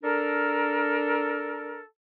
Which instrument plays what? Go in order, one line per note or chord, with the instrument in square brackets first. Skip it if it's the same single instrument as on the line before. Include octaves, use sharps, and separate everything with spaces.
[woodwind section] D4 A4 A#4